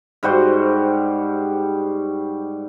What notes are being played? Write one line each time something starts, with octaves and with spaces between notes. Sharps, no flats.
G#2 G3 F#4 C5